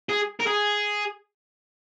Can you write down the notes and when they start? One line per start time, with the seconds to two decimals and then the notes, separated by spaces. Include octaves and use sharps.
0.09 G#4
0.40 A#4
0.47 G#4